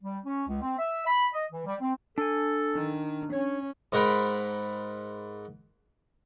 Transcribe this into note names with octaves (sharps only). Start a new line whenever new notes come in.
G3
C#4
C#2
C4
E5
B5
D#5
E3
G3
C4
D4 A4 G#5
D#3
C#4 C#5
G#2 A#4 F#5 G5 B5